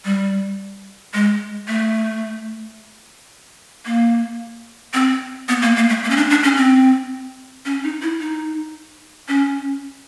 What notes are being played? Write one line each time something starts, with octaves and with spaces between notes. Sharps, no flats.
G3
G#3
A3
A#3
C4
B3
A#3
A#3
A3
A#3
C#4
D4
D4
C#4
C4
C#4
D#4
E4
D#4
C#4